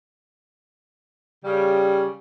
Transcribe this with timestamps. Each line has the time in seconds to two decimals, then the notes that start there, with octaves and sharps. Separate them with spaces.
1.44 C#3 G3